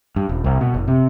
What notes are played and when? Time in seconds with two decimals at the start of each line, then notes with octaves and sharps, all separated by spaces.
0.16 G2
0.29 D#1
0.44 C2
0.61 B2
0.74 F#1
0.88 C3